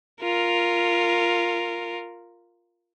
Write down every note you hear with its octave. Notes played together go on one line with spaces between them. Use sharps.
F4 A#4